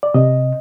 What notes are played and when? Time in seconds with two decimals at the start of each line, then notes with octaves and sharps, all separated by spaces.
0.03 D5
0.14 C3 D#5